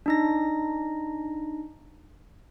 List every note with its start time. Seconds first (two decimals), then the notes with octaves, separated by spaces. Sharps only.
0.06 D4 D#4 A#6